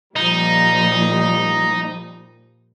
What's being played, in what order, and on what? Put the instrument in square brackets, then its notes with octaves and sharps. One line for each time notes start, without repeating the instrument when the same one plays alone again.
[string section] A#2 F3 G3 [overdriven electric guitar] D#4